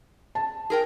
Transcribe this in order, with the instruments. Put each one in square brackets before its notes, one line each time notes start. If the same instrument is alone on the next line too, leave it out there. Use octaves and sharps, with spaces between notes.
[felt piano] A5
[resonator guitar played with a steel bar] G#4 A#4 G5